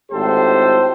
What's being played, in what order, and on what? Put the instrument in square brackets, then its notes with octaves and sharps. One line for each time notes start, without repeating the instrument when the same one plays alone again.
[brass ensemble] G#1 A2 G4 A4 C5